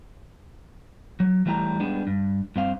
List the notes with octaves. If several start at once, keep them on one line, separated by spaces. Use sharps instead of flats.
F#3
E3 G3 A3 E4 F#5 A#5
G3 G#3 B3 D4
G2
G2 C4 F5